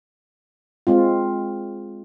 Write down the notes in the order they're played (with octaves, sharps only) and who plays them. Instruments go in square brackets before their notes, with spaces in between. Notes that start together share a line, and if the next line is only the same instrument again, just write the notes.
[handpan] G#3 C4 F4